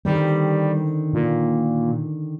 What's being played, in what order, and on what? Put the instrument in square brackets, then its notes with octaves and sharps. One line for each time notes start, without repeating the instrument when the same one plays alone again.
[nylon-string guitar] D3 D#3 C4 [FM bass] G3
[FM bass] A#2